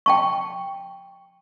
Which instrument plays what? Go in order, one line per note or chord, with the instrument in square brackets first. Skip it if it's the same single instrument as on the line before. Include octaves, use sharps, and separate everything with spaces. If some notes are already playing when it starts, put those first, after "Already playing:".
[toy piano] G5 A5 C#6